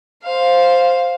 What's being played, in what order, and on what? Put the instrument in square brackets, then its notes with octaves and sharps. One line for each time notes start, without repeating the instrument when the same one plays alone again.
[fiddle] C5 F5